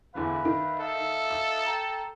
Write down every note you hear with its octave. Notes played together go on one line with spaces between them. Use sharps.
E2 D3 E3 B4 E5 F5
D#3
D#4 A4 E5 F5
E6
G5 A#5